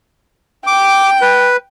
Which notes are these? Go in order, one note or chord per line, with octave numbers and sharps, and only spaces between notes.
G5 D6
B4